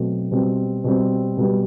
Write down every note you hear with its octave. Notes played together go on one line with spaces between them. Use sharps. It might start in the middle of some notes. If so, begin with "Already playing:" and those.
Already playing: B2 F#3 A3 C4
B2 G3 C4
B2 G3 C4
B2 G3 B3